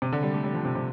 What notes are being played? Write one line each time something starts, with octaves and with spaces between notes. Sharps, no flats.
C3
D3
G3
A3
G3
F3
C3
C3